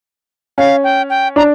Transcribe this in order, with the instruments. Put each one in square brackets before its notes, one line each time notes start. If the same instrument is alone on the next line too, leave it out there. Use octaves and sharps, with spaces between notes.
[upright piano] C#4 [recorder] F5
[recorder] G5
G5
[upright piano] D4 [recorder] A#5